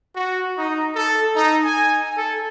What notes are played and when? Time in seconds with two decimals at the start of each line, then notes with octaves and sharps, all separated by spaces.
0.16 F#4
0.58 D#4
0.96 A4
1.35 D#4
1.65 G#5
2.16 A4